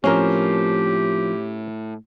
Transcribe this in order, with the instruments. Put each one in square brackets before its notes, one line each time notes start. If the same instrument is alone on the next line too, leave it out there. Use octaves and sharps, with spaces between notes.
[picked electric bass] A2 [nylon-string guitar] F3 A#3 C4 [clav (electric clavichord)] C#4 A#4 [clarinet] G4